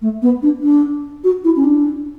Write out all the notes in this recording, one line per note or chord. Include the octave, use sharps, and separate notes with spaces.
A3
B3
D4
D4
F#4
E4
C#4
D4